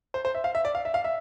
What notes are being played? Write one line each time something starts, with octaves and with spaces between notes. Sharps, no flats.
C5
C5
E5
F5
E5
D5
F5
E5
F5
E5